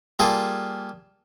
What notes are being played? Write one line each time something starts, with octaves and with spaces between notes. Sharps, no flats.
G3 A#3 F4 G#4 A4